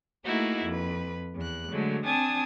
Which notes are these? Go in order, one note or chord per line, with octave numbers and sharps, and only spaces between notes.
A3 A#3 D#4 E4 F#4 G#4
F2 B4
E2 F#6
D3 F#3 G#3 A3
C4 D4 G#5 A5 D#6 G#6